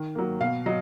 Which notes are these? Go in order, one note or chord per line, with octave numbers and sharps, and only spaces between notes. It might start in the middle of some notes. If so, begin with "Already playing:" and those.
Already playing: D#3
F#3 A#3
B2 F5
F#3 D#5